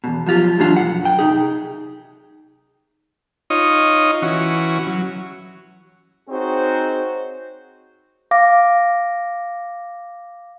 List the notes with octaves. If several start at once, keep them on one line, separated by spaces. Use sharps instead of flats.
E2 G#2 B2
F3 F#3 F4 G4
F#2 A2 E3 F#3 D4 F4
B1 F2 F#5
F#2 G5
C3 D#4 G#4
D#4 F4 C#5 D#5
E3 C#4 F#4
F#3
C4 D#4 F#4 G#4 C5 C#5
F5 D6 A#6